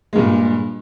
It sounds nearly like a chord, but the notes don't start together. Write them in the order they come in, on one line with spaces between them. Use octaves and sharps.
G#3 G2 A#2